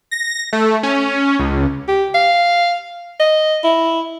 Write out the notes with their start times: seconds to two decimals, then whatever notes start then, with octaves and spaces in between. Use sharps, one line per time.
0.11 A#6
0.53 A3
0.83 C#4
1.39 C#2
1.88 G4
2.15 F5
3.20 D#5
3.64 E4